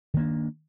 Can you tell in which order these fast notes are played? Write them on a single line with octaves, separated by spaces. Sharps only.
D#3 A#3 D4